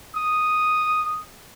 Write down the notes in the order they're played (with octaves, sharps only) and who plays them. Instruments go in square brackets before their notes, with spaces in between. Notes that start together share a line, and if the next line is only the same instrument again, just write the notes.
[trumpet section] D#6